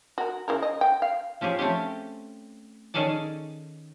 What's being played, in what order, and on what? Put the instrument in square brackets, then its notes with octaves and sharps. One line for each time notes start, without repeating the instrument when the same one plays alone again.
[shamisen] F#4 A#4
C#3 E4 A#4
D#5
G5
F5
[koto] F3 C#4 G4 G#4
A3 C4 C#4 G4
D#3 C#4 G#4 A4 D5